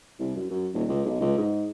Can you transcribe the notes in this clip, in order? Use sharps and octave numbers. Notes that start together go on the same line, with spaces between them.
C2
F#2
F#2
D#1
C#2
B1
C#2
G#2